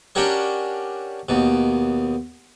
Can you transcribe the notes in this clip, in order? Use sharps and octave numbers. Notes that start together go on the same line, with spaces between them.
C#4 D4 F#4 G4 A#4 C#5
D#2 B2